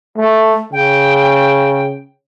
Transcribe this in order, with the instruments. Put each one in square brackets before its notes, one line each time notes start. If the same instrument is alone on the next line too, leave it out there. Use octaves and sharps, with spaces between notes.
[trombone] A3
[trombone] C#3 [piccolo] G5